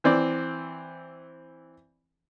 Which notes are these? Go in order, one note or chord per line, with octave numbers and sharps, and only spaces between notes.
E3 C4 D5